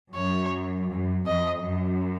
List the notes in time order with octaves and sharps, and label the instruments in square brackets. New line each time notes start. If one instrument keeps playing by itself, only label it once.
[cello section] F#2 [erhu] C#5
[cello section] F#2
[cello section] F2 [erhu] D#5
[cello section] F#2